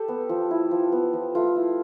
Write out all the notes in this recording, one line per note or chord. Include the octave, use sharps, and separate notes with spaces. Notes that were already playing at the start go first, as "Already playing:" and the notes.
Already playing: G4 A4
B3
F3
E4
F3
B3
F3
A3 F4
E4